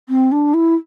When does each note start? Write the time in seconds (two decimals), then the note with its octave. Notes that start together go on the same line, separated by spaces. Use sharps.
0.09 C4
0.32 D4
0.54 E4